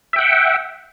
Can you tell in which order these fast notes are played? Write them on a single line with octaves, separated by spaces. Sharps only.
E5 G5 F#5